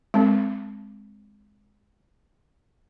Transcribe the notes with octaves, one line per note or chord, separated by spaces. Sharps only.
G#3 C4